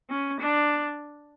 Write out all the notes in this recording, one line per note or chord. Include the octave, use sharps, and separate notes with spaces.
C#4
D4